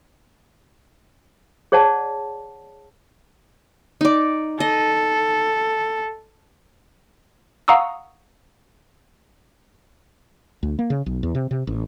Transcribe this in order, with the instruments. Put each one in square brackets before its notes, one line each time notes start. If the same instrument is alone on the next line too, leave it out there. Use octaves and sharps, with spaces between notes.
[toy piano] G#4 C#5 D5 F#5 A5
[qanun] D#4 D5
[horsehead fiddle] A4 [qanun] D#5
[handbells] F5 F#5 A#5 C#6 D#6 E6
[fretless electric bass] D2
A#3
C#3
B1
E2
C3
C3
A1